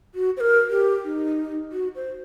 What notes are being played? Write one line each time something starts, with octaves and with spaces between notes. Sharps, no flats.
F#4
C5
A#4
G4
D#4
F#4
C5